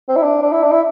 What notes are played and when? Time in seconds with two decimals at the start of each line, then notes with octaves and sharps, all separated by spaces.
0.09 C4
0.16 E4
0.23 D4
0.43 D4
0.52 E4
0.63 D4
0.71 E4